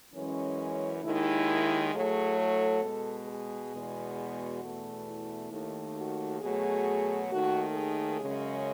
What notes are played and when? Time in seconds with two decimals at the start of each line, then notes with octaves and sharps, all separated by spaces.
0.13 F#2 E3 G#3 C#4
1.03 D#2 D#3 G#3 E4
1.93 A2 F#3 A3 G#4
2.38 A4
2.82 B2 G#3
3.28 G#4
3.72 E2 B2 G#3
4.17 F#4
4.62 E2 B2 A3
5.06 E4
5.52 D#2 D#3 A3
5.96 F#4
6.40 B2 F#3 A3 G#4
7.30 D#2 D#3 A3 F#4
7.75 G#4
8.20 F#2 C#3 G#3